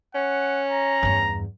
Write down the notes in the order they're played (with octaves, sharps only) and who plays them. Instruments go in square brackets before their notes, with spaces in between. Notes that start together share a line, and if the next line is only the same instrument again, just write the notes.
[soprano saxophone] C#4 [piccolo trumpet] F#5
[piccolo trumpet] A#5
[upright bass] E2 G2